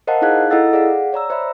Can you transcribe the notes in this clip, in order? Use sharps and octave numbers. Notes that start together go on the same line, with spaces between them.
A#4 C5 D#5 F5 F#5 A5
D#4 E4 G#4 F5 F#6 G#6
E4 A4 D#5 F#5 E6 A6
G#4 D5 F5 F#5
C#5 D5 A#5 E6
C5 D5 E5 B5